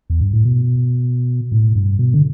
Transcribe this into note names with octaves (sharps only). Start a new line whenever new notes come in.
E2
G2
A2
B2
A2
G2
B2
D3